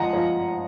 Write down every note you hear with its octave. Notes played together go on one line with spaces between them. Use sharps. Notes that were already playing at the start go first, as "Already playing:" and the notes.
Already playing: F3 D#5 F#5 G#5 A#5
F3